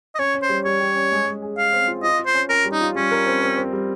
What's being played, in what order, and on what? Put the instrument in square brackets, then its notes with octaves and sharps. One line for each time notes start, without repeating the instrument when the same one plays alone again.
[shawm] D#5
[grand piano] C#4 [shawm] C#5
[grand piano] C#4
[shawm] C5
[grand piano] G3
[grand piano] G3 [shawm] C#5
[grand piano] G4
C#4
G#3
G#3
G#4
[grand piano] G#4 [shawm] F5
[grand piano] C4
F4
[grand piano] F4 [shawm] D#5
[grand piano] F4
[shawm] C5
[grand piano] C#4
[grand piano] C#4 [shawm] A#4
[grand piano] G3
[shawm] D#4
[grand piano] F4
[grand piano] G3 [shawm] C#4
[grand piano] A#4
C4
C4
C4
G3